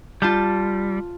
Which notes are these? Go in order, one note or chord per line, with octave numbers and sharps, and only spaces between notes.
G3 F4 A5 G6